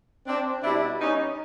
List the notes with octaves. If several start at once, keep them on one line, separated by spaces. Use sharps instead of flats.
C4 D4
B2 G3 D4 E4
C#4 D#4